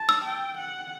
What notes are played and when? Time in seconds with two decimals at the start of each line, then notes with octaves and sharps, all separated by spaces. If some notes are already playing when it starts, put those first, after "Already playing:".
Already playing: A5
0.09 E6
0.25 G5
0.58 F#5